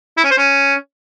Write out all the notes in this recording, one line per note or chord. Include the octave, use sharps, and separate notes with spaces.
E4
C#4
C5
C#4